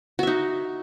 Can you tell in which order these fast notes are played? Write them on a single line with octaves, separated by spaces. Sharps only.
F#4 E5 D#4